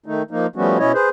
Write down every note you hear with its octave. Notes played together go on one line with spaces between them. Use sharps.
D#3 A3 D#4
F3 A#3 D#4
F3 G3 A3 B3 C#4 F#4
B2 C#4 E4 C#5 D#5
G#4 B4 C5